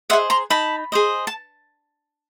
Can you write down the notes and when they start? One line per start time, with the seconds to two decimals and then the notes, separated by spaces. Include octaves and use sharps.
0.10 G#4 C5 D#5 E5 F#5
0.30 A#5 C6
0.50 D#4 A5 B5
0.92 G#4 C5 D#5
1.27 A5